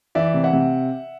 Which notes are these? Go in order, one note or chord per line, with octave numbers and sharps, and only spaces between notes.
E3 D5 E5
C3
E5 F#5
C3